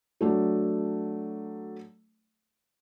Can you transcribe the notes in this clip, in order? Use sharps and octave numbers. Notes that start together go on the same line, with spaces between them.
F#3 A3 D4